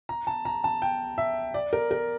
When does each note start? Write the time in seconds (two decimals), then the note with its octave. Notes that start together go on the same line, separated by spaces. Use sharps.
0.09 A#5
0.27 A5
0.45 A#5
0.64 A5
0.82 G5
1.18 E5
1.54 D5
1.73 A#4
1.91 A#4